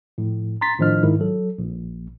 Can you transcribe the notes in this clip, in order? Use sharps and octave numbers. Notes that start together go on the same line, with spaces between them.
A2 F3
A#5 C6 A6 B6
A2 D#3 F3 D4 D#5 F6
G#2 D#3 E4
F#3 A4
A#1